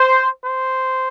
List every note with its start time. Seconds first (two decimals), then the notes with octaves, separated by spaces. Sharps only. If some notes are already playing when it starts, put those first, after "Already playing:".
Already playing: C5
0.42 C5